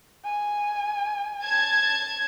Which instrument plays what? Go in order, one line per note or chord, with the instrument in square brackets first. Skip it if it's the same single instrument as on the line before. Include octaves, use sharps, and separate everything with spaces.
[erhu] G#5
[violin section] A5 G#6